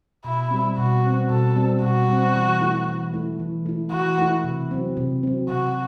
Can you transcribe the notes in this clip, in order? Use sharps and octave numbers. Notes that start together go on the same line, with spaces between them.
B2 E4
G3 C4
B2 F#4
G3 C4
B2 A4
G3 C4
B2 F#4
G3 C4
E3
A3 E4
E3
A3 E4
E3
A3 E4
E3 F#4
A3 E4
C3
F#3 C4
C3
F#3 C4
C3 F#4